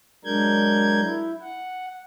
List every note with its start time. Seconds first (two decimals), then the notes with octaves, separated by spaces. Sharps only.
0.25 F#3 G#3 D4 A#4 G6 G#6
1.01 E4
1.41 F#5